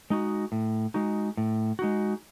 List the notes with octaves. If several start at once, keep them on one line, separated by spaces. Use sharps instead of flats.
G#3 D#4 F#4
A2
G#3 D#4 F#4
A2
G#3 D#4 F#4